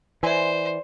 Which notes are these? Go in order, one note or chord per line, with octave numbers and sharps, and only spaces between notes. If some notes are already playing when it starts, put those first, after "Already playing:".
E3 C5 D5 E5 G#5 C6